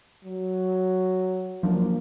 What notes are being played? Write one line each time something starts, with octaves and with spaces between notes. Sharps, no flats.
F#3
F3 F#3 A#3 D4